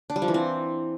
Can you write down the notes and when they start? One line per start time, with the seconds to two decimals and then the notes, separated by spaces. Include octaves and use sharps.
0.10 D4
0.16 G3
0.22 F3
0.28 E3
0.34 C4